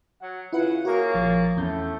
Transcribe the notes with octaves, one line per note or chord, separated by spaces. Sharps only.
F#3 F#5
C#3 E4 F4 B4 F#5
A#3 F#4 G#4 A#4 C#5 F5
A#1 F3 A6
E2 A2 D3 A3 C#4 G6